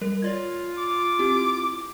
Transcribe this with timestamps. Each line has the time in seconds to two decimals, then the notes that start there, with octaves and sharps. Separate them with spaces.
0.01 G3 A#4
0.22 F4 C#5 D5 G#6
0.78 D6
1.19 C4 E4 G4